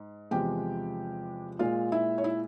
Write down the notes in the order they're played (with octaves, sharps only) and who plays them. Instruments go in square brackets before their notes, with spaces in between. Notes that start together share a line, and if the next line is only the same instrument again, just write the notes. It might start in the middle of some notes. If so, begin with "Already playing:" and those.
Already playing: [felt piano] G#2
E2 C3 F3 G#3 G4 G5
A#2 G#3 F4 F5
E4 E5
C#5
E4 E5